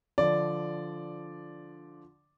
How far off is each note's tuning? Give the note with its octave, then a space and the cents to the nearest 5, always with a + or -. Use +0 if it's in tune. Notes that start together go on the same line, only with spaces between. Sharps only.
D3 -5 F3 +0 D5 +0